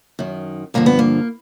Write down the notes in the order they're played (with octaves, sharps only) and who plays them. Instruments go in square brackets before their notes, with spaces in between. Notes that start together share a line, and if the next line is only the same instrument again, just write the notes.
[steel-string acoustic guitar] F#2 D#3
G2 D3 F3 A#3
B3
A#3